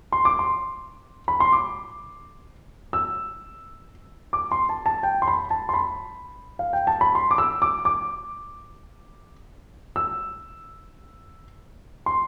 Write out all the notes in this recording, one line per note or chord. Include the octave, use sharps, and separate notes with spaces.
C6
D6
C6
B5
C6
D6
E6
D6
C6
A5
A5
G5
C6
B5
A5
C6
B5
F5
G5
A5
B5
C6
D6
E6
D6
D6
E6
C6